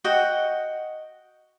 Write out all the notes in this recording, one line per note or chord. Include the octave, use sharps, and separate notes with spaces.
F#4 D#5 F#5 G5